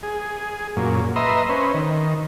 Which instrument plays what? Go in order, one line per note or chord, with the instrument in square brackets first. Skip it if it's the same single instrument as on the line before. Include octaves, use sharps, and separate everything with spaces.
[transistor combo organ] G#4
F#2 A#2
B4 D#5 E5 A#5 C6
C#4 B4 C5
D#3